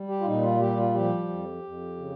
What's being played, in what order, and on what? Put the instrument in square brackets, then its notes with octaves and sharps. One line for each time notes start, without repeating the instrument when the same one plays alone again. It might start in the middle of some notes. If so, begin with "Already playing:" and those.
Already playing: [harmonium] G3
G4
F4
A#2 D#4
F4
G3 G4
F4
F3 G4
F2
F2
C#3